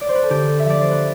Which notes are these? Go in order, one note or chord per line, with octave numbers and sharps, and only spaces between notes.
D5
C5
B4
A4
D3 G4
E5
F3 A3 D5
C5
B4